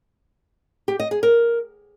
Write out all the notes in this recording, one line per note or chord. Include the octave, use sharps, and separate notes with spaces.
G4
D#5
G#4
A#4